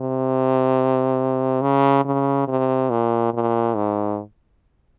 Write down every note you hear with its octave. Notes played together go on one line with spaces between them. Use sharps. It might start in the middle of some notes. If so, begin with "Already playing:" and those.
Already playing: C3
C#3
C#3
C3
A#2
A#2
G#2